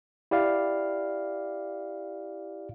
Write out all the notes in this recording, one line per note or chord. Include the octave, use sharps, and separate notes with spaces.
E4 G4 D5 F5